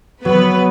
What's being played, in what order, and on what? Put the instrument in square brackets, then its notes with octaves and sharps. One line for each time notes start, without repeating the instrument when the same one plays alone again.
[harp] F#3 [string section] B3 B4